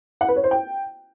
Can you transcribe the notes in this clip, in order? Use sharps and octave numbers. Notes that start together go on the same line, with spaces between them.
F#5
B4
C#5
C5
G5